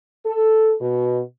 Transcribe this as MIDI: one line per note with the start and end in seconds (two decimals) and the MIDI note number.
0.25 0.73 69
0.80 1.20 47